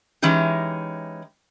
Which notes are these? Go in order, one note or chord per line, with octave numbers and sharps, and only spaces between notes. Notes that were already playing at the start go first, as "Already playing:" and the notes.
E3 G#3 C#4 D#4 G4